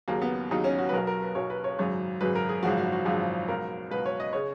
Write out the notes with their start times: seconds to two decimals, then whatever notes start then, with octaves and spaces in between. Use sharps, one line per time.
0.08 D#2 C#3 F#3 A#3
0.22 B3
0.51 D#2 C#3 F#3 D#4
0.64 C#4
0.79 F#4
0.89 B4
0.93 B1 B2 F#3 A#4
1.07 A#4
1.22 B4
1.35 B1 B2 F#3 C#5
1.50 B4
1.64 C#5
1.78 G#1 F#2 C#3 F#3 C#5
2.21 G#1 F#2 C#3 F#3 B4
2.35 A#4
2.49 G#4
2.63 G#1 F#2 C#3 F3 F#4
2.78 F#4
2.92 F#4
3.05 G#1 F#2 C#3 F3 F#4
3.48 C#2 B2 F#3 A#4
3.91 C#2 B2 F#3 B4
4.06 C#5
4.20 D#5
4.33 C#3 C#5